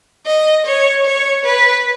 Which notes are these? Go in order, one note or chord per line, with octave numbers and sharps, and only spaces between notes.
D#5
C#5
C#5
B4